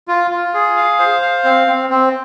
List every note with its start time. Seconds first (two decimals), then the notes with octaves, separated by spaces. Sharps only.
0.08 F4
0.31 F4
0.54 G#4
0.76 F5
0.99 C5
1.22 F5
1.44 C4
1.67 C4
1.90 C4